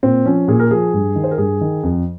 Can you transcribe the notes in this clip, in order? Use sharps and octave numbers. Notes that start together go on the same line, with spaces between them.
A#2 C4
F3 C#4
A#2 G#4
A#4
F3 G#4
G2
D#3
C5
A#4
G2 G#4
D#3
F2